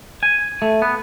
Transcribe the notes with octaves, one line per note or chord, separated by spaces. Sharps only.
G#5
A3
B3